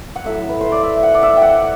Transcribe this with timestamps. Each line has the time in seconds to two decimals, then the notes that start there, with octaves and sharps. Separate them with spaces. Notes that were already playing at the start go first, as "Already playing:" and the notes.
0.16 F#5
0.25 A2 F#3 A3 E5
0.49 B4
0.61 C5
0.72 D5
0.83 E5
1.03 F#5
1.14 D5
1.23 E5
1.37 G5
1.42 F#5